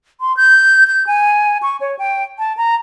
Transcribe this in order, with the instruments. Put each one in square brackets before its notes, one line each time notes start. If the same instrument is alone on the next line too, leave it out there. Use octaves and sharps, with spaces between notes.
[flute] C6
G6
G6
G#5
C#6
C#5
G5
A5
A#5